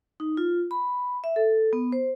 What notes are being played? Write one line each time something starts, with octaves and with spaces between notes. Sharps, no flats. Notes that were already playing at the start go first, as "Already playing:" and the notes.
D#4
F4
B5
E5
A4
B3
C5